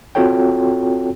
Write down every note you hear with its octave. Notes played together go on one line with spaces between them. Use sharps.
C4 F4 F#4 A4 C#5 G5